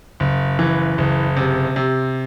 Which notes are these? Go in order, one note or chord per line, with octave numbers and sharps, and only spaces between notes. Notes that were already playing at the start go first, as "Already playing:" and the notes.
F#1
E3
F#1
C3
C3